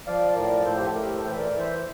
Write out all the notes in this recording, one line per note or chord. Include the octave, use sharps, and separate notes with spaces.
F3 D5 F5
A2 A#4 D5
A2 A4 C5
G4
A4
A3 G4 A#4
A4 C5
E3
E5
A#4 D5
E3
C5 E5